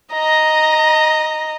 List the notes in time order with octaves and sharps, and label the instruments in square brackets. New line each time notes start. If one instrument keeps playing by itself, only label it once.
[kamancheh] D#5 A#5